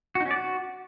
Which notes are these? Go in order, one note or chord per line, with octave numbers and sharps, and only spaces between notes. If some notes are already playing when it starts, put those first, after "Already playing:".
F#4
D#4
C#4
D5
F#4